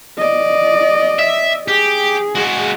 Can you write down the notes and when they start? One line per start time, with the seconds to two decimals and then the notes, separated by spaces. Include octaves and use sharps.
0.18 D5 D#5
1.19 E5
1.68 G4 G#4
2.35 G#3 F#4